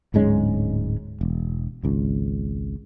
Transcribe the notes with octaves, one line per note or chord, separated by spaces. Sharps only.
D1 G#2 G#3 C#4
E1
G#1 C#2